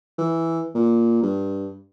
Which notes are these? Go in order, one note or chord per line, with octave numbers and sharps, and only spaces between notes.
E3
A#2
G2